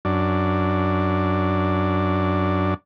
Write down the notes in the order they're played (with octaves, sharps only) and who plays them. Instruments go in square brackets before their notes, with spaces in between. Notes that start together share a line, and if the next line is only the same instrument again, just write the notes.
[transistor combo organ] F#2 D4